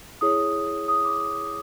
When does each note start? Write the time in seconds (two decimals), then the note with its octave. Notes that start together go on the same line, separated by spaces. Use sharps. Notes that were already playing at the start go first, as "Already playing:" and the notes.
0.21 E4 G#4 C#5 D#6
0.88 D#6
1.05 D6